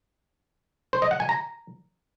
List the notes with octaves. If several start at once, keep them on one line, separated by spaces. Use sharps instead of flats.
C5
D#5
F#5
G#5
A#5